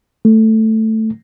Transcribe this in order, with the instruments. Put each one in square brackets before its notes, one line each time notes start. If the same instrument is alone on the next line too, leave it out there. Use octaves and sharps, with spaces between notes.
[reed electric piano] A3